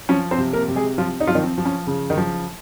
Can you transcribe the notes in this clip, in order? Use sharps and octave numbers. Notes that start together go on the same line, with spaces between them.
F3 C#4
C4 C5
C3
A#3 A#4
C3
G#3 G#4
F3 F4
D#4
F3 F4
D#3 D#4
C4
F3
C#4
C#3
D#3 D#4
F3